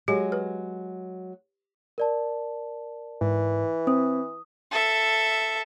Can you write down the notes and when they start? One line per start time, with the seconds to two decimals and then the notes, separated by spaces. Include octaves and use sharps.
0.08 F#3 G#3 G4
0.32 B4
1.98 A#4 D5 A5
3.21 G#2 E3
3.87 C4 D#6
4.72 A4 E5